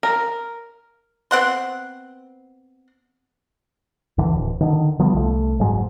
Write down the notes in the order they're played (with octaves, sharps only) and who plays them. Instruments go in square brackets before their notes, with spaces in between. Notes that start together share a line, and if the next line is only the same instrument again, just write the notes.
[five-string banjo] A#4
[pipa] B3 C4 F#5 C6
[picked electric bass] D2 D3 E3
D1
D3 D#3
D3 F3 G3 B3
C2 A3
F#1 G#2 F#3 G#3